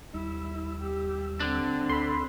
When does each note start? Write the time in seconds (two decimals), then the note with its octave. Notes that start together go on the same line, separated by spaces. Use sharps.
0.14 D#2 G3 E4 E6
0.80 G4
1.40 D3 C4 D4
1.89 D2 A4 B5 C6 E6